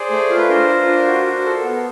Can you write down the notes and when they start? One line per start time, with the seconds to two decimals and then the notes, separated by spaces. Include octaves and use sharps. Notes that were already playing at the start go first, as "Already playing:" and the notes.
Already playing: G#4 C5 D5
0.11 A3
0.30 F4
0.38 B4
0.49 D4 A#4 C5
0.69 F4
0.87 D4
1.07 F#4
1.26 F#4
1.45 A4
1.64 B3